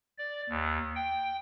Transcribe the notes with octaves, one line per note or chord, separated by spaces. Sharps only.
D5
D#2
G5